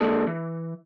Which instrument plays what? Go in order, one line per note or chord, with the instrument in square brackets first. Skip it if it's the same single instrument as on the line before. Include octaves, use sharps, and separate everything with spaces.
[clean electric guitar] D3 G#3 A#3 D4 G#4 A4
E3